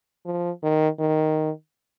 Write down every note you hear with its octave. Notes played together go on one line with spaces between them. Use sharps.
F3
D#3
D#3